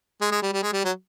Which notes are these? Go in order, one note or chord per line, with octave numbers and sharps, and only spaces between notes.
G#3
G#3
G3
G3
G#3
G3
F#3